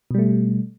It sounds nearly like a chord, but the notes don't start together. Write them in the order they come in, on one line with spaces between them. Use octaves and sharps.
B2 G3 A3